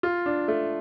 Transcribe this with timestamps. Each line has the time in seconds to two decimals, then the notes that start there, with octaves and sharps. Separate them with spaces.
0.03 F4
0.26 D4
0.48 A3